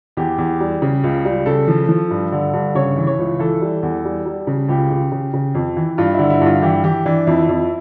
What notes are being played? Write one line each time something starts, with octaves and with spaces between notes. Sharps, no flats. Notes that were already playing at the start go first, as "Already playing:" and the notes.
E2 G4
E2
G3
C#3
C#2
G3
C#3 A4
F3
F3
G2
D3
G2
C#3 C#5
E3
C#5
C#2
E3 A4
G3
E2
G3
G3
C#3
C#2 G4
C#3
C#3
C#3
F2
E3
G2 F4
D3 E4
E4
G2 F4
E3 G4
E3 G4
E3 D4
F2 E4
F2